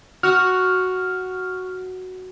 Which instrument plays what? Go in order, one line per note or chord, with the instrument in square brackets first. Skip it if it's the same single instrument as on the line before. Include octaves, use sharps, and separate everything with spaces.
[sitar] F#4 [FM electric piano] F6